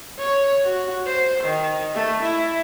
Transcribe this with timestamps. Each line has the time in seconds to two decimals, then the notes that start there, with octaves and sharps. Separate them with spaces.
0.18 C#5
0.64 F#4
1.06 C5
1.44 D#3
1.95 A3
2.23 E4